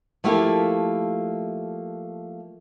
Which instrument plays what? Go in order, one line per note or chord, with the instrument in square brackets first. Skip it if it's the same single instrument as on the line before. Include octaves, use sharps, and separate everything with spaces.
[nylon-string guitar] F3 A3 A#3 E4 G4 B4